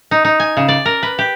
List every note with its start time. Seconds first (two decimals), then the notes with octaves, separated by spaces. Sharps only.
0.11 D#4
0.25 D#4
0.40 G#5
0.57 C#3
0.68 D5
0.86 A#4
1.03 B4
1.19 G4